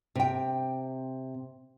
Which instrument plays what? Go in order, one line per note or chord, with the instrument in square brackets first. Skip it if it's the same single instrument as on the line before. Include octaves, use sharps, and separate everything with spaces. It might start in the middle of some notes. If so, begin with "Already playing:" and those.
[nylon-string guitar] C3 G5